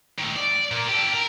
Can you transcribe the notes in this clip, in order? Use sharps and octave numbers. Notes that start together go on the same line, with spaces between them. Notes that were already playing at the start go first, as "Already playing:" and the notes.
D#3 A3
D5
A#2 A#3
G4 A4
A#4